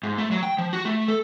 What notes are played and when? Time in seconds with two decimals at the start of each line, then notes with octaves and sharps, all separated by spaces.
0.03 G#2
0.18 A3
0.31 F#3
0.43 G5
0.58 F3
0.73 F#4
0.85 A3
1.08 A4